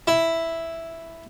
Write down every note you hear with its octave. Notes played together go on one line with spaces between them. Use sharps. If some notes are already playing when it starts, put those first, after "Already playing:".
E4